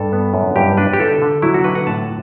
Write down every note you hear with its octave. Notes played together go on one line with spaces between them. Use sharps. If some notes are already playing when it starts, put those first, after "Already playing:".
Already playing: G2 A4
B3
F#2
G2 G4
D4 B4
G4
D3 A4
D3
F#3 E4
F#4
D3 B4
F#5
A2 A5